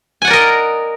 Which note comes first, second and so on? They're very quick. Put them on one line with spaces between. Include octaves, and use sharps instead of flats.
G#5 F#5 D5 A#4 D#5